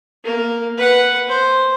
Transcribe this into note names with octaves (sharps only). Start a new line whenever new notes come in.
A#3 A#4
B4 F#5
C5